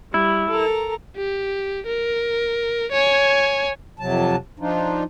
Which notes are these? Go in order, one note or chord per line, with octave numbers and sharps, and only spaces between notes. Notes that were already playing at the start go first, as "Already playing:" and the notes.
G3 E4
A4 A#4 A#5
G4
A#4
C#5 G#5
F2 C3 F#3 A5
F3 D4 D#4 F4